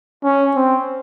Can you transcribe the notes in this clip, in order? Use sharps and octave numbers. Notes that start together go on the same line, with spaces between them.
C#4
C4